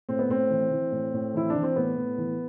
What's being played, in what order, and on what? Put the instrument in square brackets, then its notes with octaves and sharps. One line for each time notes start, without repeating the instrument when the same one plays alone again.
[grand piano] A2 C4
B3
A2 C4
E3
E3
A2
A2
E3 E4
D4
E3
C4
A2 B3
A2
E3